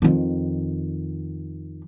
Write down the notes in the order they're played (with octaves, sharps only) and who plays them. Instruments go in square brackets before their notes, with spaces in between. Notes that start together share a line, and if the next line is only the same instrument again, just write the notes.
[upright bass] F2 D#3